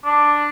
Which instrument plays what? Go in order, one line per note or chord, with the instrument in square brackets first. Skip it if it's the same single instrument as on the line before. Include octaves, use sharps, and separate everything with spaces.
[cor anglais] D4